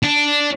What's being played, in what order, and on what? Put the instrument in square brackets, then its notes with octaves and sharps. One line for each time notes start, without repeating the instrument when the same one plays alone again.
[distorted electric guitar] D4